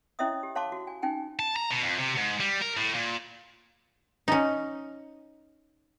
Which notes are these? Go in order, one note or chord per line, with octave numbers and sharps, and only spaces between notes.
C#4 E4 C#5 D#5 E5 D#6
G4
C#5 F5 A5 C6 D6
F#4
G#5
C#4 D#4 G5 G#5
A5
A#5
B2
F2
C3
G#2
G3
A#4
A2
A#2
C#4 D#4